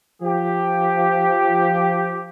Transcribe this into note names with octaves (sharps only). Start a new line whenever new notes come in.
F3 G4